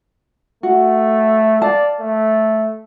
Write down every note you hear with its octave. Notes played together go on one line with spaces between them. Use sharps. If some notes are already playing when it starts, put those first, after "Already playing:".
A3 F#4
D5 F5 A5
A3